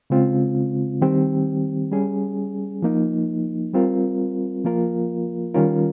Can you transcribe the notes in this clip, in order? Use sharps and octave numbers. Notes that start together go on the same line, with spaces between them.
C#3 G#3 C4 F4
D#3 G3 C4 G4
G3 C#4 G#4
F3 A#3 D#4
G3 C4 F4 A#4
F3 A#3 F4 A#4
D#3 G3 C#4 F4 A#4